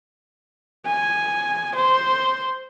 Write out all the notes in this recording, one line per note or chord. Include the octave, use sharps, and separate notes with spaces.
G#5
C5